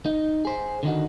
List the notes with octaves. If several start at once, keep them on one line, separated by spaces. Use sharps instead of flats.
D#4
G#4 C5
D3 D#3 D#4 F#4